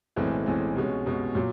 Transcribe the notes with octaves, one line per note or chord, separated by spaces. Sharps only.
B1 A2 E3 G#3 C4
B1 A2 E3 G#3 C4
C2 B2 G#3 C#4
C2 B2 G#3 C#4
A#2 F#3